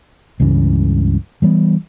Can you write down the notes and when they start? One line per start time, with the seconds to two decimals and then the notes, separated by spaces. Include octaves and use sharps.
0.40 C#2 G2 C#3 E3
1.42 E3 G3 G#3 B3